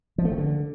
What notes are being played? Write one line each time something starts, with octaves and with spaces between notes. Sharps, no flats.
F3
A3
D#3
D3